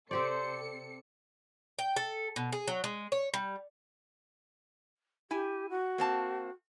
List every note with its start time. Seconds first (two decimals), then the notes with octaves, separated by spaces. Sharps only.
0.11 C3 C4 G4 A4 C5 D5 C#7
1.79 G5
1.96 A4
2.36 B2
2.52 G#4
2.68 F#3
2.84 G#3
3.12 C#5
3.34 G3
5.31 E4 G4 G#5
5.69 F#4
5.98 A#3 C4 A5